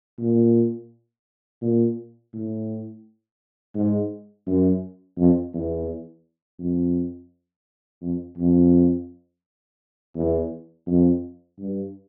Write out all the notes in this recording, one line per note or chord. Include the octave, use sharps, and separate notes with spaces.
A#2
A#2
A2
G#2
F#2
F2
E2
F2
F2
F2
E2
F2
G2